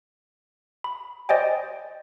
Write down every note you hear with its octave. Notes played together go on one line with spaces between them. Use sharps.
B5
C5 D5 D#5 G5 G#5